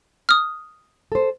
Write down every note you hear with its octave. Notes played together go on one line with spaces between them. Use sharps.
D#6 F6
A4 C5